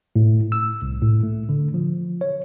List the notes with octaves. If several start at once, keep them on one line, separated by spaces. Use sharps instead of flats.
A2
E6
C2
A2
A3
D3
F3
C#5